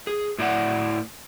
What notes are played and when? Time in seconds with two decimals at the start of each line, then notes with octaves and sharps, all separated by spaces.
0.07 G#4
0.38 A2 E4 D5 F#5